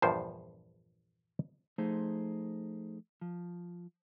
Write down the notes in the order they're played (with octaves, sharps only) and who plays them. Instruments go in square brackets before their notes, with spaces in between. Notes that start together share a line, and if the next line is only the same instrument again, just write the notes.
[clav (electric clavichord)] A#1 E2 G2 F3 C5
[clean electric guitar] F3 A3 D#4 G#4 C5
F3